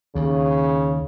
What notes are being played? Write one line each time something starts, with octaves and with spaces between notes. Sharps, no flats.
D#2 C#3